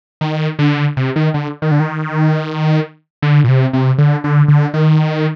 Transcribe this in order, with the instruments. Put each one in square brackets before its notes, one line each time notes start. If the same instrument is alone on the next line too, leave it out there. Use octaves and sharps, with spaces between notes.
[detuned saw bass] D#3
D3
C3
D#3
D3
D#3
D3
D#3
D3
A#2
C3
C3
D3
D3
D3
D#3